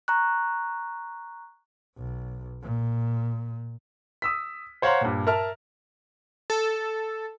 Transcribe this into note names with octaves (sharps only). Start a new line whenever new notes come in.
A#5 C#6 F#6
B1
A#2
D#6 E6 B6
C5 C#5 F5 F#5 A#5 C6
G2 A#2
A#4 E5 A5 A#5 F6
A4